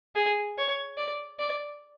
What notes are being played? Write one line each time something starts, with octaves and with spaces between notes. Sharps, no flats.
G#4
C#5
D5
D5